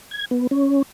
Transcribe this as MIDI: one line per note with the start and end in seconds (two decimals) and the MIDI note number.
0.11 0.25 92
0.31 0.47 59
0.51 0.82 61